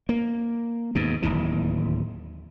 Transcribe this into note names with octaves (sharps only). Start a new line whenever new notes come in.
A#3
D#2 G#2 B2
D1 G1 D#2 E3